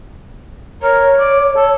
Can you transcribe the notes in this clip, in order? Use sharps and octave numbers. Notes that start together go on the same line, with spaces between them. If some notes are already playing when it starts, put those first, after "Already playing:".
A#4 C#5
D5
A4